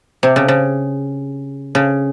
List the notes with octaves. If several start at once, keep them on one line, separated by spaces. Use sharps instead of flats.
C3
C#3
C#3
C#3